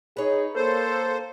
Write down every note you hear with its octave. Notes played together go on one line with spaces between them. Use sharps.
D#4 G#4 B4 C#5
A#3 A4 C5